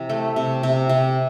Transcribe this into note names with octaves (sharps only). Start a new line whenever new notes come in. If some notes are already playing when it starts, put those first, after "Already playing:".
Already playing: C3 E3
A3
C3
C3
C3